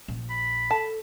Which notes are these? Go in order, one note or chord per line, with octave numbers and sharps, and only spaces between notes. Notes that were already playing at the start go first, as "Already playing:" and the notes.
A#1
B5
A4 A5